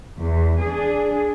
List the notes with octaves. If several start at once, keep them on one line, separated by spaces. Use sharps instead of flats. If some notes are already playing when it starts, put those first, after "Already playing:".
E2
D4 G#4